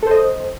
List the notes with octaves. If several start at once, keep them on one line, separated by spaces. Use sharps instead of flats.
A4 C5 D#5